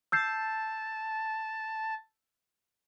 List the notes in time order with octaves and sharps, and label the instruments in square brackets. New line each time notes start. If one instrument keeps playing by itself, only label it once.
[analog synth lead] A5 [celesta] E6 G6 C7